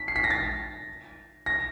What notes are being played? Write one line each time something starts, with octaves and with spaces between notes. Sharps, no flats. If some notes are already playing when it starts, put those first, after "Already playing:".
Already playing: B6
C7
B6
A#6
A6
A#6